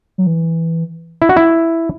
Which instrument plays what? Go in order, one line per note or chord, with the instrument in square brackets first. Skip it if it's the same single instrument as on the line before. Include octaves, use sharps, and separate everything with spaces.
[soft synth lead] F#3
E3
[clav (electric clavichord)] E4
F#4
E4